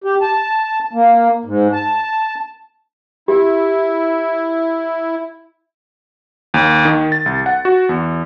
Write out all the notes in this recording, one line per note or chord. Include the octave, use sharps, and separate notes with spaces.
G4
A5
A#3
G#2
A5
E4 G4
D#2
D#3
A6
C2
F#5
F#4
E2